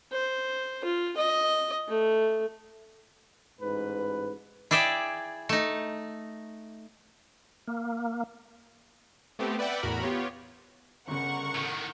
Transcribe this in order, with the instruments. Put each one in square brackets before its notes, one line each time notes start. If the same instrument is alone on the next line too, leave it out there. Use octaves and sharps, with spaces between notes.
[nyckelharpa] C5
F4
D#5
A3
[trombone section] A1 G#2 B4
[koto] E4 G#4 D5 E5 G5
A3 D#4
[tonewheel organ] A#3
[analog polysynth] A3 B3 C4 G4
B4 D5 E5 F#5 G5
E2 A2 F#4 A#4 B5
B3 F4 G4 C#5
[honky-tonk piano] G1 C#3 [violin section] A#4 F#5 C#6
[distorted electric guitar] A2 D#3